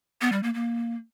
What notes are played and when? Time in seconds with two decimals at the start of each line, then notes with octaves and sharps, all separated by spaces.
0.21 B3
0.32 G3
0.43 A#3
0.54 A#3